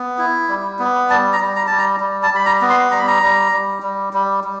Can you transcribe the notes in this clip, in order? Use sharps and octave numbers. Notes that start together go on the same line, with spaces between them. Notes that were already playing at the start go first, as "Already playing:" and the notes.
Already playing: B3
E4
G3
B3
G3 A5
A#5
G3
A#5
G3 A5
A#5
G3
A5
G3 B5
A#5
B3
C6
G3 A#5
B5
A#5
G3
G3
G3
G3
G3